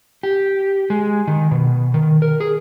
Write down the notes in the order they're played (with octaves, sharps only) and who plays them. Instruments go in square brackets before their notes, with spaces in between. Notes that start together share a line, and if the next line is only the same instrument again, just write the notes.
[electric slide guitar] G4
G#3
D#3
B2
D#3
A#4
G#4